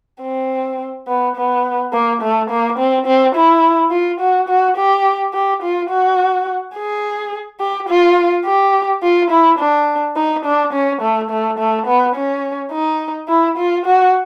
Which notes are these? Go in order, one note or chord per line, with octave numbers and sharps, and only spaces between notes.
C4
B3
B3
A#3
A3
A#3
C4
C4
E4
F4
F#4
F#4
G4
G4
F4
F#4
G#4
G4
F4
G4
F4
E4
D4
D#4
D4
C#4
A3
A3
A3
B3
C#4
D#4
E4
F4
F#4